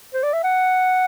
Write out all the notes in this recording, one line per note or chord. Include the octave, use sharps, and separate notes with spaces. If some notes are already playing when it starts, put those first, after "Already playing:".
C5
D5
E5
F#5